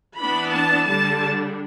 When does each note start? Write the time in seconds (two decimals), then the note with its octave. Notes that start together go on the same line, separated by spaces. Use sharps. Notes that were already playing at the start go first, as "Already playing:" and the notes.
0.17 E3 B3 D4 B5
0.52 A5
0.86 D3 G3 D4 A5